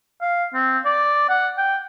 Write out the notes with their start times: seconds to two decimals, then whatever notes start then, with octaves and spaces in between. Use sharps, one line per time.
0.22 F5
0.54 C4
0.85 D5
1.29 F#5
1.58 G5